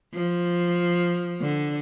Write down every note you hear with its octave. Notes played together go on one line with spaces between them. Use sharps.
F3
D3